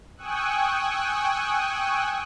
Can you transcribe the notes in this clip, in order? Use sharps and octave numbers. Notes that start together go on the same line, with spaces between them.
G5 G#5 C#6 D#6 E6 F#6